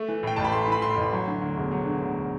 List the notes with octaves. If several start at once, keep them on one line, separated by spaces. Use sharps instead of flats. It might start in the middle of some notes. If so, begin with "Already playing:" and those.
Already playing: A3
E3
A2 G5
A1 A5
B5
A3 C6
E3 B5
A2 C6
A1
F#3
D3
D2
E1
F#3
D3
D2